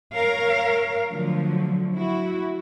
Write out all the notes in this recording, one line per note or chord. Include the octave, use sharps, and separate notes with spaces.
A#4 C#5 F5
D3 F3 F#3 A3
E4 F#4